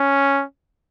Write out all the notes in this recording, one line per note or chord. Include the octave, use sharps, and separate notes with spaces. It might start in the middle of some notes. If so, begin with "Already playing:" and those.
Already playing: C#4